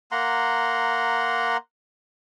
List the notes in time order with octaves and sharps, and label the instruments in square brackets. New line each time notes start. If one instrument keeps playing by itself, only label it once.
[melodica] A#3 F#5 A#5 C6